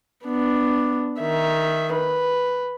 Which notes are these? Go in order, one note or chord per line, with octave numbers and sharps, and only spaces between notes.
B3 D4
D#3 E5
B4